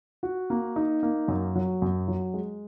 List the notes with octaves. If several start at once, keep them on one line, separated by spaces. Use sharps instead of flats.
F#4
A#3
D#4
A#3
F#2
F#3
F#2
F#3
G#3